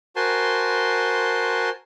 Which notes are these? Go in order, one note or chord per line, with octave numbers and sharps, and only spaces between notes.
F#4 A#4 C5 G#5 A5 C6